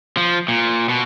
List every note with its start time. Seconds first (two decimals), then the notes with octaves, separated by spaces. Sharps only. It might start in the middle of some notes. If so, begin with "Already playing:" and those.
0.17 F3
0.48 A#2
0.89 B2